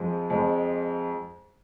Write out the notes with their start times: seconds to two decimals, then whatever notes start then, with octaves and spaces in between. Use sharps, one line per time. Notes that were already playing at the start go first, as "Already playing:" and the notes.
Already playing: F2 F3 G#3
0.30 F2 F3 G#3